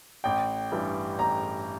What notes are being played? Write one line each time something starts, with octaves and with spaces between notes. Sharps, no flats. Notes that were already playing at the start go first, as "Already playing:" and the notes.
A1 G5
G2 E3 G3
A1 A#5